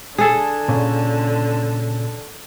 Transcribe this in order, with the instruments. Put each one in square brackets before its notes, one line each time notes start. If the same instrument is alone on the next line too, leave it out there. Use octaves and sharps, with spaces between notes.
[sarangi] D3 [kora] G#4 A4
[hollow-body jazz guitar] A#2 C#3